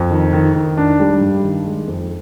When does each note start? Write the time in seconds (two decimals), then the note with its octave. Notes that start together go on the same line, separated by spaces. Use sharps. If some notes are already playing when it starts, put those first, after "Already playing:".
Already playing: F2
0.11 D#3
0.33 D#3
0.55 D#3
0.77 D4
0.99 G3
1.21 G2
1.43 D#3
1.66 G#3
1.88 F2